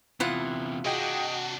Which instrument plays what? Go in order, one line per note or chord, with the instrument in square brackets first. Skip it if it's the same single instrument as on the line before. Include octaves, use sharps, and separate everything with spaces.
[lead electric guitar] E2 C3 [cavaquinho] E4 F4 F#5
[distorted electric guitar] C3 D4 [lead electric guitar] F#4 [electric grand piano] G#4 D#5 G5